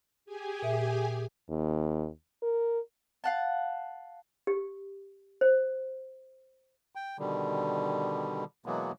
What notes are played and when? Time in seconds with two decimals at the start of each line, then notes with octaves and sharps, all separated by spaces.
0.25 G4 G#4 G#5
0.62 A#2 E5
1.50 D#2
2.42 A#4
3.24 F5 F#5 A5
4.47 G4
5.41 C5
6.95 G5
7.19 B2 D3 D#3 G3
8.66 B2 E3 F#3 G#3 A#3 B3